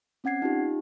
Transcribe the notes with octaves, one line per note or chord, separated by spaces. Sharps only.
C4 C#4 F#5 G#6 C7
D#4 F4 G4